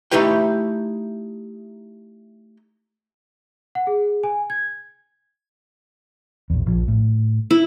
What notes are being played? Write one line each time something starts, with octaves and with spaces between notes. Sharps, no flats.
A3 D#4 E4 G4 B4 G5
F#5
G#4
G#5
G#6
A#1 E2
A#1 F3
A2
E4